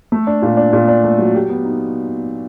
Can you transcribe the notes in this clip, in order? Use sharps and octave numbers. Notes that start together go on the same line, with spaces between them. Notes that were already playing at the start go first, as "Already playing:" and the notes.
A3
D4
A#2
D4
A#2
D4
A3
F#3
G4
B3
D#4